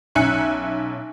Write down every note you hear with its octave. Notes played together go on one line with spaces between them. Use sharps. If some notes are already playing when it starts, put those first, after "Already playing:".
B1 C#4 E5 G#5 F#6 C#7